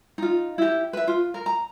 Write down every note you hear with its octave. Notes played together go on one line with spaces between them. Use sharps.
D#4 F4
E4 G4
B4 E5
F4
A#4
A#5